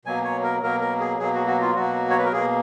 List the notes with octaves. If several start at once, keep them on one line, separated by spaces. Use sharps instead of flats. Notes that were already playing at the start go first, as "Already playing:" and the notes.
B2 F#3 A#3 G#5
C#5
A#4
B2 F#3 A#3 A#4
A#4
G#4
B2 F#3 A#3 G#4
F#4
F#4
F4
B2 F#3 A#3 F#4
C#5
B4
A#4
B2 A#3 G#4